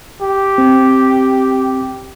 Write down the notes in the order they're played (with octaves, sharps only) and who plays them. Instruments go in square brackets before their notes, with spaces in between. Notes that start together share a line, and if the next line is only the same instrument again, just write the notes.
[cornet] G4
[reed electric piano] C4